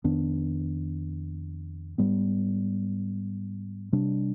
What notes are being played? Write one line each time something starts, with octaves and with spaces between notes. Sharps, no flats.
F2 D#3 B3 D4
G#2 G3 B3
C3 G3 D4